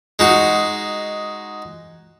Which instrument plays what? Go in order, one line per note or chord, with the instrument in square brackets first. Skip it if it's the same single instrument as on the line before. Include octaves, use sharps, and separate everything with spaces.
[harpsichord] G#3 D#4 F#4